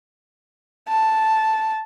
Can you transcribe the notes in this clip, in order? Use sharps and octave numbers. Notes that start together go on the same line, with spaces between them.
A5